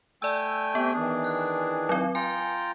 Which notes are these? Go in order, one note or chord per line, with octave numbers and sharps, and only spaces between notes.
A3 D5 G5 G#5 E6
B3 C4 G4
D#3 E3 D4 G#4
F#6
F#3 C4
F4 G5 G#5 A#5